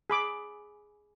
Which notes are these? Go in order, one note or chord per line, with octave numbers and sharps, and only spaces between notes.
G#4 B5 D6